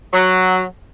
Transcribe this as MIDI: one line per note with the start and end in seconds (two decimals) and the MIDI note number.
0.13 0.63 54